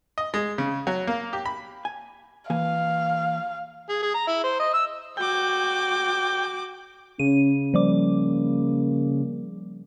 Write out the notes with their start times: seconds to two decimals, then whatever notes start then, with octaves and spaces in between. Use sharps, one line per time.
0.18 D#5
0.34 G#3
0.58 C#3
0.87 F#3
1.07 A#3
1.33 G4
1.46 B5
1.85 G#5
2.50 E3 A#3 F5 G#5
3.89 G#4
4.02 G#4
4.14 A#5
4.27 E4
4.44 C5
4.59 D#5
4.74 E6
5.17 F#4 G5 D6
7.19 C#3 C#4 D#7
7.74 F3 G3 A#3 D6